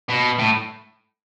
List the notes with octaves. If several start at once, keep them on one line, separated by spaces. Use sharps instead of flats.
B2
A2